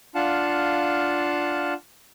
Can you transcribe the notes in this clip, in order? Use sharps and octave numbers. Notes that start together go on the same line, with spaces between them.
D4 F4 F5 F#5 A5